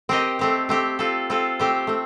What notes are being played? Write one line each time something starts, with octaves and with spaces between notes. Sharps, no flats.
C4 G4 A#4 D#5
A3 C4 G4
A3 C4 G4
C4 F4 A4
C4 F4 A4
A3 C4 G4 C5
A3 C4